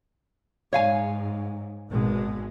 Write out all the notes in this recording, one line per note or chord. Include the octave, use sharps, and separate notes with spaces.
G#2 C#5 F5 G#5
G#1 B2 G#3